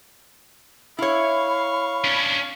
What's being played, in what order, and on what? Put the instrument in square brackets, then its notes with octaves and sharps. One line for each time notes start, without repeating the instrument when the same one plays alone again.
[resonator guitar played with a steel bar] E4 C#5 [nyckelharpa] F5 C#6 [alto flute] B5
[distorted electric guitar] C#4 D4